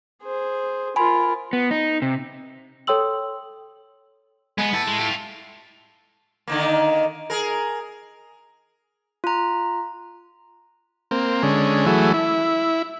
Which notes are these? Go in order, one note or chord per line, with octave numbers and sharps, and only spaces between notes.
G#4 C5
F4 A#4 G#5 B5 C6
B3
D#4
C3
A4 C#5 G5 C6 E6 F#7
G#3 B3
E4 A5
G#3
F4 G4
D3 D#3 A#3
G#4 A#4
F4 A#5
A#3 C4
D3 G#3 C#4
E3 F#3 A3 G#4
E4